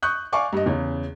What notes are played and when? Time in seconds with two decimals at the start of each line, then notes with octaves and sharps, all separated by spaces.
0.03 C#6 D#6 F#6 G6
0.33 D5 F5 G#5 C#6 D6
0.53 G2 D#5
0.66 E2 C#3